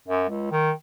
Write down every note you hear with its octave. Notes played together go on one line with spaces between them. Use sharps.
F#2
C#2
D#3